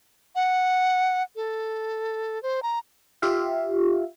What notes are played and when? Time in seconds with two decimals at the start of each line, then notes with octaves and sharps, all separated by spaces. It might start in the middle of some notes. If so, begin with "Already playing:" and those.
0.36 F#5
1.36 A4
2.43 C5
2.63 A#5
3.22 F4 G4 E5 F5